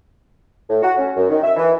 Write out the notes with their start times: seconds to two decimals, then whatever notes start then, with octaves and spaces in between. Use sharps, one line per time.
0.70 A2
0.82 F#4
0.97 C#4
1.16 F#2
1.29 D#3
1.44 E5
1.56 E3